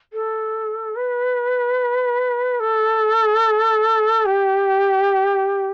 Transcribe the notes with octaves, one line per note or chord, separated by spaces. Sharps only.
A4
B4
A4
G4